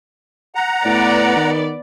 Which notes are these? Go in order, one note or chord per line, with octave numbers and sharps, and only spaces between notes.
F#5 A#5
A2 B3 D5
D#3